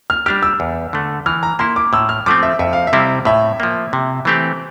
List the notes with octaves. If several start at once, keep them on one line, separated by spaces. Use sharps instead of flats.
F6
G3 D4 G4 F6
E6
E2
D3 A3
E3 F6
A#5
A#3 E4 C6
D6
A2 E6
F6
F3 A3 C4 D6
E5
F2 E5
F5
E5
C3 G3 C4 E4
A2 E5
F3 A#3
C3
E3 A3 C4 G4